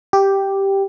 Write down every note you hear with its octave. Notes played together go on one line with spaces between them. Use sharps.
G4